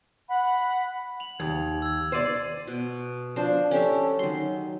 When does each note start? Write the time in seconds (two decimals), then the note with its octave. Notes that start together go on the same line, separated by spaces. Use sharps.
0.28 F#5 B5
1.20 F7 F#7
1.40 D#2 G#6
1.82 E6 G#6
2.12 C5 D5 G#6 D#7
2.67 B2
3.36 F3 D4 C5
3.71 C#4 G4 A4 E5
4.19 D#3 F#3 C6